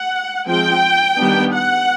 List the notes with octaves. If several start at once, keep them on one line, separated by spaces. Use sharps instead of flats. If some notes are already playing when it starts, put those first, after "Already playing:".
Already playing: F#5
F3 G#3 C4 G5
D#3 G3 B3 D4
F#5